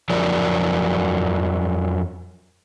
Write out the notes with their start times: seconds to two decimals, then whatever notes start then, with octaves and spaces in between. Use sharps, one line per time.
0.10 F2 F3 F#3 A#4 D5